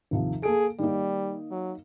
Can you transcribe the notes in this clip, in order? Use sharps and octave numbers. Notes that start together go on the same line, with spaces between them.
D#2 C3 F3
A#3 G#4 A4 D7
D#3 G3 A#3 D#4
F#3